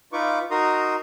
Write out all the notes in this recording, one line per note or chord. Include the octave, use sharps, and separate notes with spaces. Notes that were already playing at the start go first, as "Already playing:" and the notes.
D#4 F4 B4 C#6 D6
D#4 F#4 A#4 A#5 C6 D#6